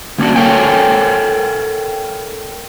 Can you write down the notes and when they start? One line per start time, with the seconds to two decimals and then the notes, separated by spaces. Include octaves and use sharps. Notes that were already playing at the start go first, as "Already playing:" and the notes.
0.18 D3 A#3 C#4 D4 F#4
0.35 A4 A#4 C#5 F5 G5 G#5